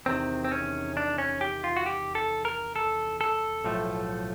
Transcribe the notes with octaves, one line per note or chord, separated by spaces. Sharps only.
E2 C3 D#3 C4
C4
C#4
D4
C#4
G4
F4
F#4
G4
A4
A#4
A4
A4
B1 A2 F3 A3